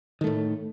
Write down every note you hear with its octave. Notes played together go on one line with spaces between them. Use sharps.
A2 D#3 A3